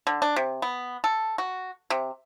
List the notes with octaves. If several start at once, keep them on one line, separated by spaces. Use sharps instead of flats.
D3
D4
C3
B3
A4
F#4
C3